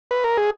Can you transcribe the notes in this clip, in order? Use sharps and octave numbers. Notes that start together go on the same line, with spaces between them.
B4
A#4
G#4